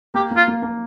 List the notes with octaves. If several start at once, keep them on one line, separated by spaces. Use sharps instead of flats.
A#3 G4
A#3
F4
A#3
A#3